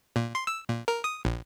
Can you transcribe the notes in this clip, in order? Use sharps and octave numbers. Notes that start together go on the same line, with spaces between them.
A#2
C6
E6
A#2
A#4
D#6
A#1